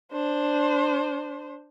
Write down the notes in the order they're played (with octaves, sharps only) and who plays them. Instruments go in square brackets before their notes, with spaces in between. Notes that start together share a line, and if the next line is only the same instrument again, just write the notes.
[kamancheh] D4 C5